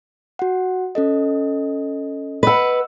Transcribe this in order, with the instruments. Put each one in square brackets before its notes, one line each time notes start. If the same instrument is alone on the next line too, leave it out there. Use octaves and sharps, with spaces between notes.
[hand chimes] F#4 F#5
C#4 A4 D#5
[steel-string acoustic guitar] B4 F#5 [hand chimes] D#5 E6